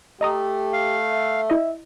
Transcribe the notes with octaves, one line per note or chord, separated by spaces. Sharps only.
A3 G4 D#5 A#5 D#6
F5
E5
E4 D#5